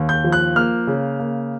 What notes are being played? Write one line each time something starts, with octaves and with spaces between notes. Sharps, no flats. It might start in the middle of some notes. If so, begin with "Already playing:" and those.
Already playing: D#2
G6
F3
F#6
A#3 F6
C#3
A#3